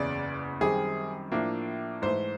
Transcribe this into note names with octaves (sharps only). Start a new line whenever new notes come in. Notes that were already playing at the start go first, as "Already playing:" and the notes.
Already playing: F#1 E2 C#3 D5
F#2 D#3 G3 C4 G#4
A2 F3 A#3 D4
G#2 E3 A3 C5